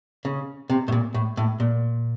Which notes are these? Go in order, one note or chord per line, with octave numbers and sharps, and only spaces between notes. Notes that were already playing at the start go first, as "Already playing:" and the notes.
C#3
C3
A2
A#2
A2
A2
A#2